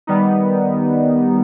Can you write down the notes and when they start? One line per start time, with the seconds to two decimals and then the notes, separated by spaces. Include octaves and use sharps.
0.07 D#3 G3 B3 D#4